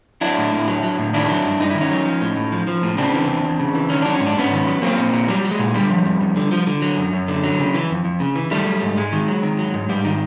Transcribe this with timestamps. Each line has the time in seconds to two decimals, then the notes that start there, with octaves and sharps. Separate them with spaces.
0.21 F#3 D4 E4
0.37 A2
0.52 A2
0.68 F#3
0.83 F#3
0.98 A2
1.13 D#3 D4 E4
1.29 F#3
1.45 G2
1.60 G2 D#4
1.70 D#3 E4
1.81 C#4 D#4
1.91 F#3
2.05 F3
2.21 A2
2.37 A2
2.52 F3
2.67 F3
2.83 A2
2.98 C#3 C4 D4
3.14 E3
3.29 E2
3.44 E2
3.60 C#3
3.75 E3
3.90 D#3 C#4
4.02 F#3 D4
4.14 C#4
4.21 G#2
4.27 D4
4.36 G#2 B3 C#4
4.52 D#3
4.67 F#3
4.82 F#3 A#3 C4
4.98 A#2
5.13 A#2
5.28 F#3 G3
5.44 F#3
5.51 G#3
5.59 A#2
5.74 D3 G3
5.90 F3
6.05 F2
6.21 F2
6.36 D3
6.51 F3
6.67 D3
6.82 F#3
6.97 F#2
7.13 F#2
7.28 D3
7.44 F#3
7.59 C#3
7.74 E3
7.90 F2
8.05 F2
8.20 C#3
8.36 E3
8.51 D#3 G3 A3
8.66 F#3
8.82 G#2
8.97 G#2 G#3
9.13 D#3
9.28 F#3
9.43 D#3
9.59 F#3
9.74 G#2
9.89 G#2 G3
10.05 D#3